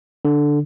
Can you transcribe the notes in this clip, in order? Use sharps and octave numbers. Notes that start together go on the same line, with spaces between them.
D3